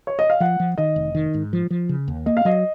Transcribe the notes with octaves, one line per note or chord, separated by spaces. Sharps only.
C#5
D#5
F5
F3 F#5
F3
D#3 D#5
F1
D#3
G#2
F3
F3
C#3
D#2
A#3 D#5
F5
F#3 D#5